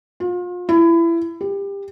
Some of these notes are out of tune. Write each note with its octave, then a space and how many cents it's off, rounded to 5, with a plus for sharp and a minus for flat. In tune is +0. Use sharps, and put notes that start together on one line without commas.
F4 +35
E4 +25
G4 +25